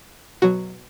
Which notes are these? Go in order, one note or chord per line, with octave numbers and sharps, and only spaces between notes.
B2 F#3 F#4